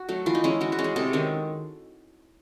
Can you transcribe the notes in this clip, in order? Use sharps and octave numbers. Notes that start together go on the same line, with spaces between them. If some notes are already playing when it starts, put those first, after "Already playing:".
Already playing: F#4
F#3 A3
E3 F4
D#4
G#3 C#4 E4
E3 F#4
F#4
G#3 C#4
G#4
C3 A4
D#3 G#3 C#4